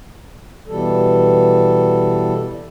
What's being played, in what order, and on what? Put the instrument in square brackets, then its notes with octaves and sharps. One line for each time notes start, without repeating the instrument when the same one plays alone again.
[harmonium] B2 E3 G3 A4